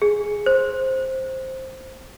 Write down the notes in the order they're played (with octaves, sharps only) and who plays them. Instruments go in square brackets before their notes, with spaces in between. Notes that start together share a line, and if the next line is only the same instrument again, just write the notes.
[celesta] G#4
C5